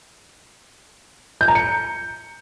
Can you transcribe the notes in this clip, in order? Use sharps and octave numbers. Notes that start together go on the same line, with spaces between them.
G6
A#5
C#7